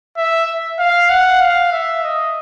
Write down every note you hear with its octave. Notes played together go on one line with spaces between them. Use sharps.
E5
F5
F#5
F5
E5
D#5